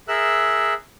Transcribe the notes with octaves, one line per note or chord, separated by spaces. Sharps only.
G#4 A#4 E5 E6 F#6